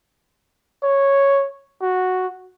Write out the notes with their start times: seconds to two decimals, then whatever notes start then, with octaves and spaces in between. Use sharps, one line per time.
0.83 C#5
1.82 F#4